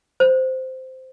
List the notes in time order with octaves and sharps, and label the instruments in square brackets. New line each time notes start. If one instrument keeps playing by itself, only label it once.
[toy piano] C5